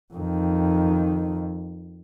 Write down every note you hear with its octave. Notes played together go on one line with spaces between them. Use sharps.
F2 D#3